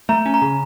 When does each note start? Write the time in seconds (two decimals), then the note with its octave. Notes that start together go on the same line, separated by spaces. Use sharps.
0.09 A3 A#5
0.26 C#4
0.34 A#5
0.42 C#3